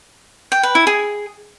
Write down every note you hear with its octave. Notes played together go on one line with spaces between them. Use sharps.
G5
B4
E4
G#4